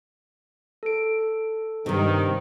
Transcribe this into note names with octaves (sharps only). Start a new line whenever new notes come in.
A4 D7
G2 C3 D#3